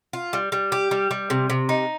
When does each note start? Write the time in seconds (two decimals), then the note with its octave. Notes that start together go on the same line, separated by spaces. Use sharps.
0.13 F4
0.33 G3
0.52 G3
0.72 G4
0.91 G3
1.11 G3
1.30 C3
1.50 C3
1.69 D#4